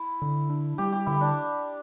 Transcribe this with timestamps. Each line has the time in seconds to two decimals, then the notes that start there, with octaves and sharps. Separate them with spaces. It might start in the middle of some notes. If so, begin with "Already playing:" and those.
Already playing: E4
0.22 D3
0.49 D4
0.78 G3 G4
0.92 G4
1.06 D3 E4
1.21 D4